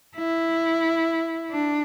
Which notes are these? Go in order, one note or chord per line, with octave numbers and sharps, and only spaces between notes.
E4
D4